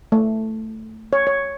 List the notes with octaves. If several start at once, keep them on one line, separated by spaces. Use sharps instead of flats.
A3
C#5
C#5